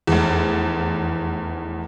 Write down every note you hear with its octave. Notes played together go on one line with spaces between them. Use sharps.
F1 E2